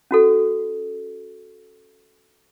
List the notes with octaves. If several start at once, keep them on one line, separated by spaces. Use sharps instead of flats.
C#4 F#4 A4